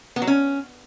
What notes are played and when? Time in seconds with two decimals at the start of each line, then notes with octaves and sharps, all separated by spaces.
0.16 B3
0.22 F#3
0.27 C#4